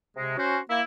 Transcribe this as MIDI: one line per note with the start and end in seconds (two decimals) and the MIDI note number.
0.16 0.37 48
0.16 0.37 56
0.37 0.58 61
0.37 0.58 66
0.37 0.58 72
0.70 0.82 58
0.70 0.82 64